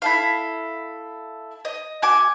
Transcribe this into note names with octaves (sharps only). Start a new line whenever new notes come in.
E4 A4 F5
D#5
F#4 G#5 D6